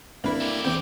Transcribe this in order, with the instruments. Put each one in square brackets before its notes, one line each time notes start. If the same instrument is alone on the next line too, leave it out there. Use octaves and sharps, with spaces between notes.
[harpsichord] C2 B4 [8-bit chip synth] A#3 E4 [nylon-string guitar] D4
[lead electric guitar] A3 G4
[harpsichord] E2 C3 [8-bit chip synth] G5 D6